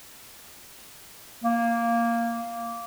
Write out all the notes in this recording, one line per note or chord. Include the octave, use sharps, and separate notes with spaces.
A#3